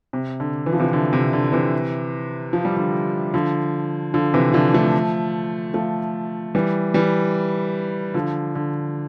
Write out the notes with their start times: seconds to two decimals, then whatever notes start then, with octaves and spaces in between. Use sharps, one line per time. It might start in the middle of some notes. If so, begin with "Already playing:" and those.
0.13 C3
0.40 D3
0.66 E3
0.73 F3
0.80 C3 E3
0.93 D3
1.13 C3
1.33 D3
1.52 C3 E3
2.53 F3
2.65 G3
2.76 D3 F3
3.34 D3 F3
4.14 D3 F3
4.34 C3 E3
4.53 D3 F3
4.74 F3 A3
5.74 F3 A3
6.55 E3 G3
6.94 E3 G3
8.14 D3 F3
8.55 D3